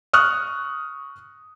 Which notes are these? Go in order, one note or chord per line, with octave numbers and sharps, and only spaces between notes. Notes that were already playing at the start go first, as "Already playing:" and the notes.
C#6 D#6 F6 F#6